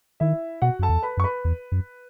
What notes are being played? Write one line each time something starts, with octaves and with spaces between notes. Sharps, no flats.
D#3 E4 E5
B2 F#4 F#5
F#2 A4 A5
E2
B4 B5
F#2 C#6
B4 B5
E2
F#2